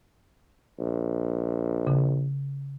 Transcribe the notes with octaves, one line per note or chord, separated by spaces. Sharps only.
A#1
C#3